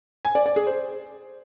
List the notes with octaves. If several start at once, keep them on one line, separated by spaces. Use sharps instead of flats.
G#5
D5
D5
G#4
C5